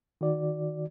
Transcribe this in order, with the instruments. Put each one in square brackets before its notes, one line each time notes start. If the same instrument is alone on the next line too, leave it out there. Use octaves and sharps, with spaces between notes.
[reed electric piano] D#3 F#4 D5